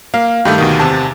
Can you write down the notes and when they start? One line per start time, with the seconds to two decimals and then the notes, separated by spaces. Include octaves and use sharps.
0.14 A#3 F5
0.45 G2 D#3 A3 G4
0.58 D2 B2 D#3
0.80 E2 C3 A5